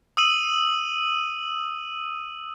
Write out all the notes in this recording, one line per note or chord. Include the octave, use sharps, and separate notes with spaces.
D#6 E6 D#7 F#7